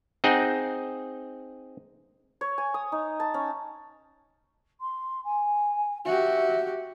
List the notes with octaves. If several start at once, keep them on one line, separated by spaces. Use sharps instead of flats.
C4 D#4 G#4 F#5 G5
C#5
G#5
D#6
D#4
A5
C#4
C6
G#5
F#4 G4 E5